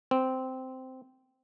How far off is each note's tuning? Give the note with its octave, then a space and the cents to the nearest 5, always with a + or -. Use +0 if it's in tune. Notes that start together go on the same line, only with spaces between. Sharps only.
C4 -10